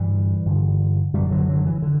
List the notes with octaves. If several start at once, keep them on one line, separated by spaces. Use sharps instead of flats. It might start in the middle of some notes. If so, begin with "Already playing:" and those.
Already playing: G2 D3 E3 G3
G2 D3
F#2 D3 E3 G3
D3 F#3
D3 F#3
E3
D3